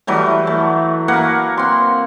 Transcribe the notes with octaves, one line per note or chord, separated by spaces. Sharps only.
E3 F#3 G3 A3
A3
A#3 A#4 B4 F#5
C4 C6